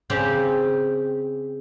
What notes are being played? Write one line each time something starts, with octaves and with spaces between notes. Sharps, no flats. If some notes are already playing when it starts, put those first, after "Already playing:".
C#3 C4 G4